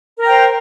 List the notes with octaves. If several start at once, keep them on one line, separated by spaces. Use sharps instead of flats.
A#4 C5 G5 A#5